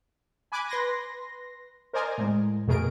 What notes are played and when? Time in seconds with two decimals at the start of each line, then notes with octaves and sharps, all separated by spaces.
0.52 G#5 B5 D6 F#6 G#6
0.69 B4 C6 A#6
1.93 A#4 C5 D5 D#5 G#5 A#5
2.18 A2 G#3
2.67 F2 B2 A3 G#4 A#4 D7